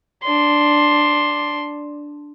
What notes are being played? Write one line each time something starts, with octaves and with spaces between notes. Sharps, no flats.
D4 C6